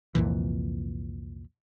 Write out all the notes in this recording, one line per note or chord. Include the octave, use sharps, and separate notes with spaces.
C2 F2 A#2 E3